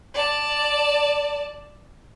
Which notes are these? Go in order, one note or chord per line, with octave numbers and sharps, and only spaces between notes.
D5 A5